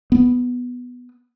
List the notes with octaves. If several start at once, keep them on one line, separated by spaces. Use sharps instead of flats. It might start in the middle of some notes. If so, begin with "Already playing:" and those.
B3